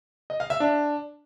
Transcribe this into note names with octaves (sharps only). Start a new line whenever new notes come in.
D#5
F5
E5
D4